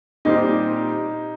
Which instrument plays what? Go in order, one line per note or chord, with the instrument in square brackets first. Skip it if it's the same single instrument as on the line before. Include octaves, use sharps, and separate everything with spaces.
[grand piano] A#2 G3 C4 G4 C5 [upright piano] D#4